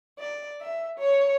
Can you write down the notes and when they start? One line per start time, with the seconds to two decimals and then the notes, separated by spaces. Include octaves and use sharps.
0.19 D5
0.61 E5
0.99 C#5